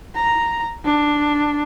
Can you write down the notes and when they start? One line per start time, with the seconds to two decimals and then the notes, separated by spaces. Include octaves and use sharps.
0.15 A#5
0.84 D4